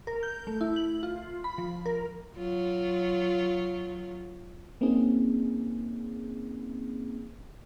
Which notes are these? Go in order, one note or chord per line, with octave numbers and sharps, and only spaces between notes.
A#4
G6
A3
E4
F#7
F4
B5
F3
A#4
F#3 F4
A#3 C4 C#4 D#4 G#4